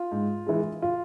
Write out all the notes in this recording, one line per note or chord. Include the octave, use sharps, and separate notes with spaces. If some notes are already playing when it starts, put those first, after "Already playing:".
Already playing: F4
G#2
E3 G#3
F4